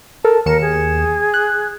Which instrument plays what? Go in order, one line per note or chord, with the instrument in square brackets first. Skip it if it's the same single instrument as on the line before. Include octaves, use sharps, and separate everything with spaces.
[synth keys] A4 A#4 [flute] A5
[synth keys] D#2 C#7 E7 [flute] A#4
[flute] G#4
[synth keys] F#6